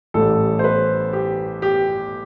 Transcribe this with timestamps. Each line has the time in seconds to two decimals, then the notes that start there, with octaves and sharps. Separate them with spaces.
0.14 A1 A2 G3 A4
0.59 C5
0.64 B4
1.13 G4
1.62 G4